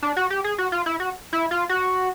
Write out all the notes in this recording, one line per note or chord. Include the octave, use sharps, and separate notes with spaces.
D4
F#4
G4
G#4
F#4
F4
E4
F#4
E4
F4
F#4